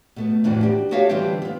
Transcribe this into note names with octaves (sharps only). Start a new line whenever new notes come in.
B2 A3 B3
F2 A2 E3 D4 F#4
D4 F#4 G4
F#4 G4 A4 C#5 E5 F5
D3 E3 G3 C4 F4 G4
B3 F4